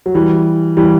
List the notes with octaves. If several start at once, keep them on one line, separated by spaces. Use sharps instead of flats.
F#3
E3 G3
E3 G3